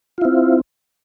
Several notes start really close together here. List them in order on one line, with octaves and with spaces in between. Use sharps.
F4 E4 C4